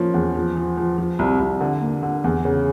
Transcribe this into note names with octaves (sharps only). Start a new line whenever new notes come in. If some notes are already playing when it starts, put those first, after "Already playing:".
Already playing: F3 A#3 C#4
E2
F3
F3
F3
F3
C2
C2
D3
A#3
D3
E2
C#3